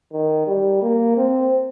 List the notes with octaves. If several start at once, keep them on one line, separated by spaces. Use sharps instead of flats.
D#3
G3
A#3
C4